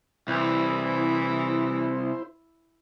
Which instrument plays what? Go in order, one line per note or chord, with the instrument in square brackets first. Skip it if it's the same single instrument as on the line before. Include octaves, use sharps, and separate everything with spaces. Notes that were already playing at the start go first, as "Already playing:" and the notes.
[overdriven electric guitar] C2 [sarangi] E3 [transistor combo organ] E4 C5